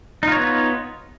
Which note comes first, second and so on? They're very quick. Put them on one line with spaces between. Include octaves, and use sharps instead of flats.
D#4 F4 C#5 B3